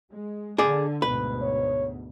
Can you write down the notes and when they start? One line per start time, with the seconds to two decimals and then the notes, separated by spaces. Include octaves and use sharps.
0.12 G#3
0.58 D3 G#4 D5
1.02 D2 G#2 B2 B4
1.42 C#5